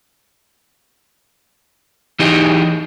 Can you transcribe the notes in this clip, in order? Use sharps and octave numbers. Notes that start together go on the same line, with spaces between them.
E3 D#4 G4 G#4 D#5